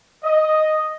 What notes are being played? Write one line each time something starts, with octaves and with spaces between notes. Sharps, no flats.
D#5